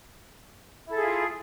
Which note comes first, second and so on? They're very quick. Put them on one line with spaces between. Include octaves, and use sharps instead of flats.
E4 A4 G#4 F4